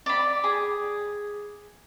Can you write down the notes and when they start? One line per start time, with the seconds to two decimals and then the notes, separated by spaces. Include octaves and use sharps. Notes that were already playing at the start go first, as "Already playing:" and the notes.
0.06 D5 B5
0.44 G#4